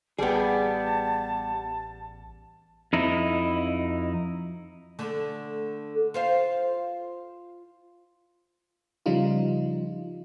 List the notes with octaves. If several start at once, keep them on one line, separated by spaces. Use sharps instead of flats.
A1 G3 B3 G4 G#4 A5
F2 D#4 E4
D3 A3 A4
F4 C5 F5
C#3 F3 G3 D#4 F4